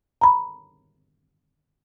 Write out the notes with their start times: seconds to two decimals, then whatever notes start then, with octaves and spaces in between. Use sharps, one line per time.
0.21 A#5 B5